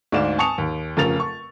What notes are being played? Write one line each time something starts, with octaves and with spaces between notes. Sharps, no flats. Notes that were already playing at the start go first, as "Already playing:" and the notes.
D2 G#2 D5 F5 E7
G#5 A5 C#6 D#6 C#7 F7
D#2
F1 C#3 A#4 A6 F7
C#6